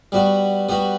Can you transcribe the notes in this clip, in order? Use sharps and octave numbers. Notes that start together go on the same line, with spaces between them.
G3 B3 F#4
G3 B3 F#4